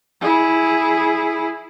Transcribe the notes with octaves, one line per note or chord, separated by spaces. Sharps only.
E4 G#4